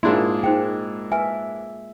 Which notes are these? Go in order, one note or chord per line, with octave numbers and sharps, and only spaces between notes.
G#2 A#3 D4 E4 F4 G#4 C6
G#3 D#4 G#4 C5 G5
B4 E5 G#5